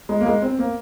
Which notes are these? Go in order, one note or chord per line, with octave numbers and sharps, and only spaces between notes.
G#3
A#3
G#3
C4
A#3